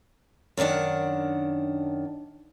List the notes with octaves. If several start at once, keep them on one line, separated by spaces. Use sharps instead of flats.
F#2 D3 D#3 D4 F#5